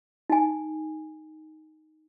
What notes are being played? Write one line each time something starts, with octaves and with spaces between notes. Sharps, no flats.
D#4 G#5